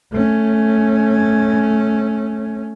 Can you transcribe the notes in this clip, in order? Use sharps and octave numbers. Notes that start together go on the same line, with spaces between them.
A3 C#4